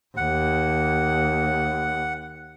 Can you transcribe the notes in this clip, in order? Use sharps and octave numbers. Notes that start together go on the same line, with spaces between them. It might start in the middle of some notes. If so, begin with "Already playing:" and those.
D#2 F#5